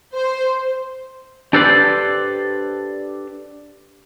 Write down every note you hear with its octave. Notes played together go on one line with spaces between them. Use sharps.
C5
D4 G4 A4 B4 C5 D5